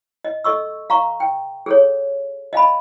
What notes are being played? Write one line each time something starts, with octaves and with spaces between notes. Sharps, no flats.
D#5
A4 D#5 C#6 E6
F5 A#5 C#6
G5
G#4 A4 C#5
D#5 F5 G#5 B5